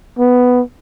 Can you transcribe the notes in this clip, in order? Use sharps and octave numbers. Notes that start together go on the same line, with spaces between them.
B3